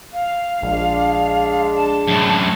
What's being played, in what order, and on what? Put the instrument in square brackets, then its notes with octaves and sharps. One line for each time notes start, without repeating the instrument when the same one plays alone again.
[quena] F5
[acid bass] A#1 [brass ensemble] G#3 D4
[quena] A5
[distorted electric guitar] F#2 A2